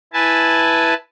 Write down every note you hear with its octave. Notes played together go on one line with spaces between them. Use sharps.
E4 B4 G#5 A5